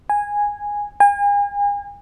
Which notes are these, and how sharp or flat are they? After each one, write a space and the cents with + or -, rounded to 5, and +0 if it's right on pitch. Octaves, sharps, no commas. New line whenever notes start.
G#5 -10
G#5 -40